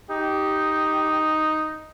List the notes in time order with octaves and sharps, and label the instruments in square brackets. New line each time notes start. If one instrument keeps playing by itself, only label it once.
[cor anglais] D#4 [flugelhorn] G4